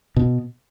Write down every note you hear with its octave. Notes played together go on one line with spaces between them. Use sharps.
B2